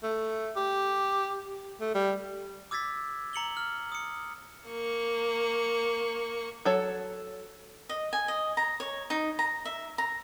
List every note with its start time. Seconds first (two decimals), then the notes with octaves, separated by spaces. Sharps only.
0.03 A3
0.56 G4
1.81 A3
1.95 G3
2.71 D6 E6 G#6 A6 B6
3.33 A#5 C#7 F#7 G7
3.57 F6
3.92 D#6 C#7
4.69 A#3 C#6
6.65 F#3 A4 C#5
7.89 D#5
8.13 G#5
8.28 D#5
8.57 A#5
8.80 C#5
9.10 D#4
9.39 A#5
9.65 E5
9.98 A#5